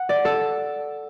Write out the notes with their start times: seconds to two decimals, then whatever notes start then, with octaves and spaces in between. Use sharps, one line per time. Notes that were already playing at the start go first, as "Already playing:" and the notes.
Already playing: F#5
0.09 D5
0.25 A4